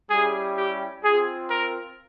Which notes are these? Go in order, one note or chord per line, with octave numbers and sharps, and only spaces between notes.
G3 C#4 E4 G4 G#4
G4
C4 F4 G#4
A#4